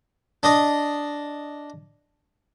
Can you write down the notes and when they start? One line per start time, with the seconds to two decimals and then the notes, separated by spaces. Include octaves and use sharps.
0.43 D4 D#5